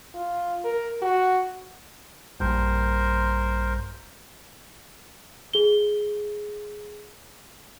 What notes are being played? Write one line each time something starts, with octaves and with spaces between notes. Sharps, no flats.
F4
A#4
F#4
A#1 G2 A#4 C5
G#4 G7